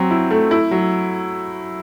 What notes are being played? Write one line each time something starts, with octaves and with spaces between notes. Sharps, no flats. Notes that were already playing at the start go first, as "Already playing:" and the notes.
Already playing: F#3 C4
E4
A3
E4
F#3